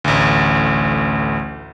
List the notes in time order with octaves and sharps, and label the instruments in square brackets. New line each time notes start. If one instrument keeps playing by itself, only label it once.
[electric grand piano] A1 D2